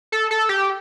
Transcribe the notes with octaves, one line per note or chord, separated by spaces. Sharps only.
A4
A4
G4